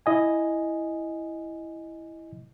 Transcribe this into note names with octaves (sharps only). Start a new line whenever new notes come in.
E4 D#5 G#5